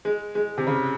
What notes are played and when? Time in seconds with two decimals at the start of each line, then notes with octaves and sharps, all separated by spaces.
0.05 G#3
0.35 G#3
0.58 C3
0.67 C#3